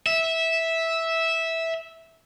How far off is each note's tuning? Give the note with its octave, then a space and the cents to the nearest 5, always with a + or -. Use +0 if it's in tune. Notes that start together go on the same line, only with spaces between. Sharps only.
E5 -10